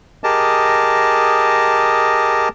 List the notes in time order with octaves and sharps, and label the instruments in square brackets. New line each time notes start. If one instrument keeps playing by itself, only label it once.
[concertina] G4 G#4 A#4 D#5 A5